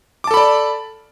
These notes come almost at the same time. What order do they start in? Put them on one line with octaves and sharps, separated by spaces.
D6 A5 A4 B5 D5